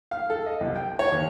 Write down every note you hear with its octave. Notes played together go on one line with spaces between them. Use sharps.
F5
A4
D#5
C2
G5
C#5
D#2